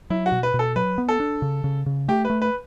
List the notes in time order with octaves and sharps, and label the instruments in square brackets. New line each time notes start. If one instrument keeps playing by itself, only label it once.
[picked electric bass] F#3 [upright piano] E4
[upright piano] F#4
[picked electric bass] B2
[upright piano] B4
[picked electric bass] B2
[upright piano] A4
[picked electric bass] F#3 [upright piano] B4
[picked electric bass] B3
[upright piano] A4
[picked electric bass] D4
C#3
C#3
C#3
[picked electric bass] A3 [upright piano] G4
[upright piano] B4
[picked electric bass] A3
[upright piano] B4